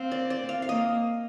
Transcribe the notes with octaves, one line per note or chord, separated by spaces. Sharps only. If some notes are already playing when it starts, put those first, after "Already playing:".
Already playing: C4 F5
D5
D5
F5
F5
A#3 D#5